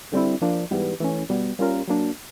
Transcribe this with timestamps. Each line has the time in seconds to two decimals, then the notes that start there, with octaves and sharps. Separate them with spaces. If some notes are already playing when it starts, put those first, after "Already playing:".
0.12 D3 G3 C4 E4
0.41 F3 A#3 D4
0.71 G#2 E3 G3 B3
1.00 E3 A3 C#4
1.29 B2 G3 B3
1.59 G3 A#3 C#4 F4 A#4
1.88 F#3 A#3 D4